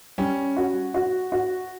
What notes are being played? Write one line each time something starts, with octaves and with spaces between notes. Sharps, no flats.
G3 C#4
F#4
F#4
F#4